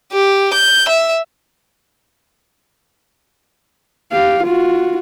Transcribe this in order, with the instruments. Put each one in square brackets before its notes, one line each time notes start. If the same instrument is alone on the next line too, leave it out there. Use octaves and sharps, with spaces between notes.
[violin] G4
G6
E5
[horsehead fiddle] G4 F5
F4 F#4